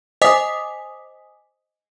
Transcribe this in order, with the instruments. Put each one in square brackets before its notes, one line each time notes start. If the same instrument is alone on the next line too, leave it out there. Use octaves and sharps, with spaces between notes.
[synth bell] C5 D#5 G#5 D6 D#6 B6